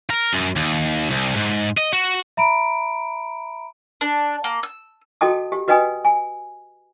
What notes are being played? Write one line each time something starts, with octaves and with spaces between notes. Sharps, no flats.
A#4
F#2
D#2
C2
G#2
D#5
F#4
E5 A#5 B5 D7
D4
A#3
E6
F#4 A4 D#5 G5 A5 D#6
G4
F#4 B4 D#5 G5 G#5 D#6
G#5